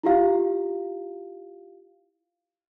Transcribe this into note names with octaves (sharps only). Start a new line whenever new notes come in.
E4 F4 G4 F5